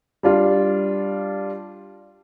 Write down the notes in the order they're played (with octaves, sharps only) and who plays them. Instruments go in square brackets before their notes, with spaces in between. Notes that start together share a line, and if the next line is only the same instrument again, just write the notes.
[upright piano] G3 D4 F4